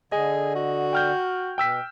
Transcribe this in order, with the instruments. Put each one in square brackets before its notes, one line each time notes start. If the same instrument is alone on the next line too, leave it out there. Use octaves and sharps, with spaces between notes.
[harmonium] D3 [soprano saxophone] G#4 [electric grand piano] D#5
[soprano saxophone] F#4
[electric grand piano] G5 F6 G6
[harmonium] B2 [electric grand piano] G5 E6 B6